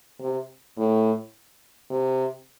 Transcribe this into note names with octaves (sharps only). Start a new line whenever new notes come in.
C3
A2
C3